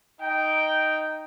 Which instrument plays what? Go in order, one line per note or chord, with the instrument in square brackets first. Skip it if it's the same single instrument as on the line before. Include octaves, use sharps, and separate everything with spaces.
[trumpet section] D#4 G5